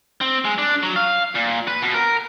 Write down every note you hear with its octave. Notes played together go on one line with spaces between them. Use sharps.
C4
G#3
D4
F#3
F5
A#2
B4
B2
A#4